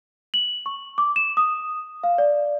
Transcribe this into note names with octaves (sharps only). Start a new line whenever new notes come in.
F#7
C#6
D6
E7
D#6
F5
D5